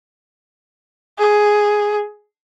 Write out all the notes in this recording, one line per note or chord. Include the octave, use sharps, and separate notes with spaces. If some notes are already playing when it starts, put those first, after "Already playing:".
G#4